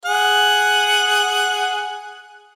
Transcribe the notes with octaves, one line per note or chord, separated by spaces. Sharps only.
G#4 F#5